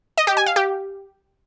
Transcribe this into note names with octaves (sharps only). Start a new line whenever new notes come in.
D#5
G4
G#5
F5
G4